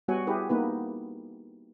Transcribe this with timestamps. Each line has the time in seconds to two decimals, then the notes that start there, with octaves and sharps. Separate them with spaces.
0.08 G3 B3 F#4 C#5 F#5 G#5
0.27 E4 G4 G#4 B4
0.50 A#3 B3 D#4 B4